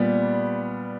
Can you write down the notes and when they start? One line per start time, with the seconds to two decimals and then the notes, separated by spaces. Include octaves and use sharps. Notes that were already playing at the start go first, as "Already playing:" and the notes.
Already playing: A#2 G3 B3